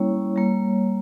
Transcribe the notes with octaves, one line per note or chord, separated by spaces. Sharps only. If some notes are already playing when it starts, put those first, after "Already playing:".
Already playing: G3 A#3 C#4 E4 C#5
G3 A#3